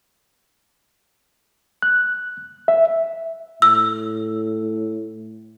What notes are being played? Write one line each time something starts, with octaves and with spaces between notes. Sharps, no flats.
F#6
E5
A2 E6